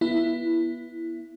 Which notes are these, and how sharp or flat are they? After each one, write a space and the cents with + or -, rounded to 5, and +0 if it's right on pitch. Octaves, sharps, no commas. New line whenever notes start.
B3 -20 E4 +10